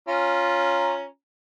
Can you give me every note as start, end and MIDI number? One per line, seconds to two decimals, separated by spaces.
0.08 1.05 61
0.08 1.05 65
0.08 1.05 82